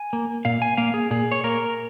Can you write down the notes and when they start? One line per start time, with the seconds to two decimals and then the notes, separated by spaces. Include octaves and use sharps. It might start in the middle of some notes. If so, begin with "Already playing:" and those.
Already playing: G#5
0.13 A#3
0.45 A#2 F5
0.62 G#5
0.77 A#3 F5
0.94 G#4
1.11 A#2 G#4
1.32 C#5
1.44 A#3 A#4